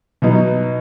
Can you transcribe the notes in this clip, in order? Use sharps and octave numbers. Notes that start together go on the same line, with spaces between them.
B2 F#3 B3 D#4